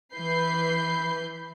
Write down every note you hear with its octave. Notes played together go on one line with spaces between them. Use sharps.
E3 B4 E5 B5 G6 C7